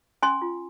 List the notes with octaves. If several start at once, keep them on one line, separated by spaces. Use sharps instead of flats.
C#4 G#5 C6
F4